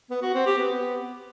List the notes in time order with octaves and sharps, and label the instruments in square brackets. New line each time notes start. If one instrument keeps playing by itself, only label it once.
[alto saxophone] B3
F#4
C4
G4
B3